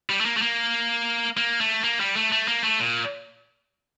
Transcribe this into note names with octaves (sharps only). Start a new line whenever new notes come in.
G3
A3
A#3
A3
A#3
A#3
A3
A#3
G3
A3
A3
A#3
A3
A#2